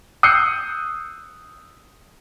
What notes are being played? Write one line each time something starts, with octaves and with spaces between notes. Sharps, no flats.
D#6 E6 F#6 G6 C7 C#7